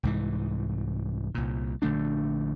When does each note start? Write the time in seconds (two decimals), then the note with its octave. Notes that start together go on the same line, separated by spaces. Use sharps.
0.03 C2 G#2 E3
1.35 C2 A#2
1.82 A#1 D3 A3 D4